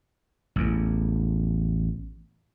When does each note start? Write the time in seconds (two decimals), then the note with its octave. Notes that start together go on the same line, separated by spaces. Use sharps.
0.56 A1 E2